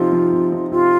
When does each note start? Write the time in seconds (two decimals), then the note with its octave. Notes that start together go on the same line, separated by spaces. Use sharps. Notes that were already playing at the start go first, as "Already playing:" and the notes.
Already playing: C3 F3 D#4 F4
0.13 F3 D#4
0.33 C3
0.52 F3 D#4
0.71 C3 F4